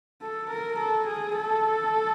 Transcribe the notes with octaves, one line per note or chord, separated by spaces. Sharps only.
A4
A#4
A4
G#4
A4